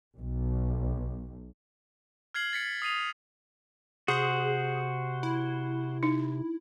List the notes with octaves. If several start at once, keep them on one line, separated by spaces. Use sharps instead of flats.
B1
F6 G#6 C7 F#7
A6 B6 C#7
D#6 C7 D#7 F7
C3 F#4 G#4 C5
E4
D#4